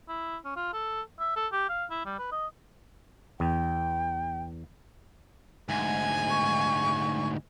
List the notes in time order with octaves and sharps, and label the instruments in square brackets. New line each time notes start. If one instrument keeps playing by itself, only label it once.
[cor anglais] E4
C#4
F4
A4
E5
A4
G4
F5
E4
G3
B4
D#5
[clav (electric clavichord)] E2 [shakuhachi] G5
[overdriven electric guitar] D2 G#2 [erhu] G#5
[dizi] C#6